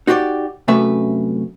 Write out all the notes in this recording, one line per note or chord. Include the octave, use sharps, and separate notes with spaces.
D#4 F#4 G4 C5 D5
F#2 C3 A3 C#4 B4 E5